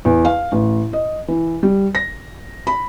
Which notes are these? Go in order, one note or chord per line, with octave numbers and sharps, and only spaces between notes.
E2
F5
A1
D#5
E3
G3
A#6
B5